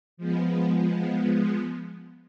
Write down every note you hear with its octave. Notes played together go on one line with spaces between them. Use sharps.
F3 G#3 B3